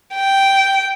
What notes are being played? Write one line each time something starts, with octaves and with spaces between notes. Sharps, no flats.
G5